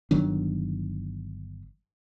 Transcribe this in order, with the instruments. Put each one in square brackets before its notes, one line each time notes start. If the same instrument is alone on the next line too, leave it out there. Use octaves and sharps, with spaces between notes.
[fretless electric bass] G1 D#3 F#3 D4